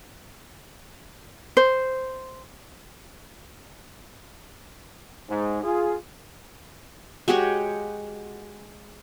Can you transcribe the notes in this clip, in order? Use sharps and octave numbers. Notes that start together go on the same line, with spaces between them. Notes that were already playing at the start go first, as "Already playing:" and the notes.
C5
G#2
F4 G#4
G#3 F#4 G4 C#5